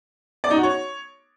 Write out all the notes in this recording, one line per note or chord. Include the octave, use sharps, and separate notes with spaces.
D5
D#4
F#4
C#5